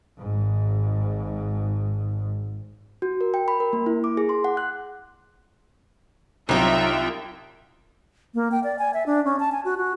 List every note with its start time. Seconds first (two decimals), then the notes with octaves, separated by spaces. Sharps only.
0.19 G#1 G#2
3.02 F#4
3.21 A#4
3.34 G5
3.48 B5
3.60 A#4
3.73 A#3
3.86 E4
4.04 D6
4.17 G#4
4.29 C6
4.44 F#5
4.57 F#6
6.49 C2 F#3 D#4 F4 E5 G5
8.34 A#3
8.51 G5
8.64 D5
8.79 G#5
8.94 E5
9.06 D4
9.25 C#4
9.39 A5
9.52 G#5
9.65 F#4
9.77 F#4